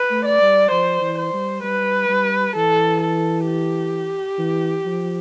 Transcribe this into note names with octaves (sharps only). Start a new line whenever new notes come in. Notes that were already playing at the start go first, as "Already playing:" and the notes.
Already playing: B4
A3
D5
G3
F3 C5
E3
C5
G3
G3 B4
G3
E3 A4
A4
G4
E3
F3